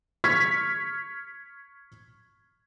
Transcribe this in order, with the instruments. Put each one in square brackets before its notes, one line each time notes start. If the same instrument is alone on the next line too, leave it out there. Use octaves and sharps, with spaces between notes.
[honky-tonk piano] C#6 F6 G#6 B6